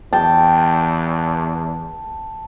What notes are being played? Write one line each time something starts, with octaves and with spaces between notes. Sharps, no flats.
E2 G5 A5